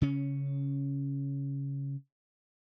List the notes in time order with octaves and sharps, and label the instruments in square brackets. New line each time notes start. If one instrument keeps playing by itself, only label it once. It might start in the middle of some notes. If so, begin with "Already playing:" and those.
[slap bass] C#3 C#4